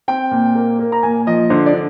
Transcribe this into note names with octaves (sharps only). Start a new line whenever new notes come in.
C4 G5
A#2
A#3
A#3
A#5
A#2 G#5
F3 D#5
D3 C5
D5
D3